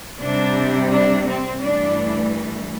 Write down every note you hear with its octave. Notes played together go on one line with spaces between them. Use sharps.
C3 G3 D4
D4
C4
G2 E3 A3 D4